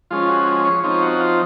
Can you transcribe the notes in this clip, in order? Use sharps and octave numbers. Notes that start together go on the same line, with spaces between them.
F3 G#3 C#4 F4
F#4
C#5
F3 C4 D#4 C#5
F#4
F4